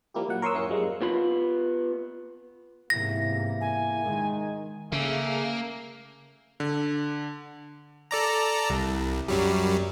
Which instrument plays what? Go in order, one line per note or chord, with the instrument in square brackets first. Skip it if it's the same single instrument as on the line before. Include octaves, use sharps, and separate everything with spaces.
[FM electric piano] F3 G3 A#3 E4 G4
A#2 F#3 F#5
A#4 C#5 C6 C#6 D#6 E6
F#2 C#4 E4 C6 C#7
F#2 F3 G3 G#3 A#3
[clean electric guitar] B3 F4 B5
[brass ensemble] E2 A#3 E4 [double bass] G#2 C3 [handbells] A#6
[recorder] G#5
[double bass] D#3 [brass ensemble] G#3
[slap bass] C#3 [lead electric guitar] A#3 [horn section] G#4 A4 E5
[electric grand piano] D3
[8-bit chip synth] A4 D5 A#5
C2
F#2 F#3 G3